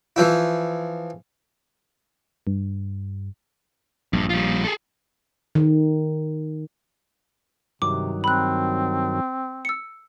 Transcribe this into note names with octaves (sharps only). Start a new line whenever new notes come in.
E3 F3 E4
G2
A#1 G2
G3 F4
G#4 A4
D#3
G2 C3 D#3 F#3 D6
C4 B5 F#6
E6 C#7